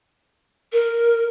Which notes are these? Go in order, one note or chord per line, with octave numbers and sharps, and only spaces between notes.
A#4